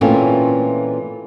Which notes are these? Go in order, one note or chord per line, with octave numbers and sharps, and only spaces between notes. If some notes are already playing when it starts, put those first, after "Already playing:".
A#2 E3 A3 C4 C#4 F4